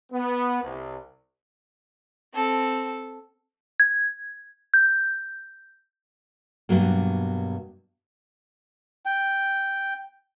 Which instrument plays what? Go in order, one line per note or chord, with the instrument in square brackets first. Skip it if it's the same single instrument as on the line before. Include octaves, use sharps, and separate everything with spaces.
[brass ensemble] B3
C2
[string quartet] C4 A4
[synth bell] G#6
G6
[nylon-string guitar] G2 B2 F#3 A#3
[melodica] G5